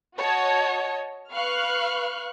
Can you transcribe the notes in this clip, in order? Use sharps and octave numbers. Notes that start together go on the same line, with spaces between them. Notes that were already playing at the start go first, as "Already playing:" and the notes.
F#4 C#5 D#5 A5
B4 F5 C#6 F6 F#6